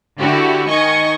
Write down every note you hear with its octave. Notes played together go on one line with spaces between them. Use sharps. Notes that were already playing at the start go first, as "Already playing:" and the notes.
D3 E4 F#4 G4
D#3 D#5 G#5 C#6